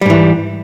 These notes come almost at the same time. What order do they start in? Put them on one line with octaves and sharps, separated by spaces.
G3 G#2 E3